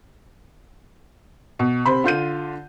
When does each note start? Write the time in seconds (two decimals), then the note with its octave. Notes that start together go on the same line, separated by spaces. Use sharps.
1.59 B2
1.86 C3 C5 B5
2.04 D3 F4 G6 D#7